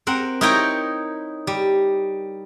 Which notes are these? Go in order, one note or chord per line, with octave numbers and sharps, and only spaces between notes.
C4 A#4 F#5
D#4 E4 A#4 C#5 G5 A#5
G3